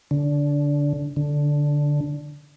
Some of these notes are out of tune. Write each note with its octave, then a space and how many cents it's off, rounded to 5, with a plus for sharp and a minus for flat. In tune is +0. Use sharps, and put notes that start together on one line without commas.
D3 -20
D3 -5